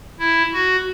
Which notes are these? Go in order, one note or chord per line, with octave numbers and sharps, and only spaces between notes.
E4
F#4